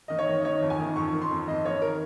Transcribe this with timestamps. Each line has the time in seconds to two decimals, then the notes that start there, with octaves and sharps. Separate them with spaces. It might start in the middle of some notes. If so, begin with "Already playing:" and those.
0.08 D#3 D#5
0.19 C#5
0.28 D#3
0.41 D#5
0.44 D#3 C#5
0.62 F2
0.70 G#5
0.80 D#3
0.96 F2 C#6
1.14 D#3
1.22 C6
1.31 F2
1.48 F2 D#5
1.65 D#3 C#5
1.82 A#4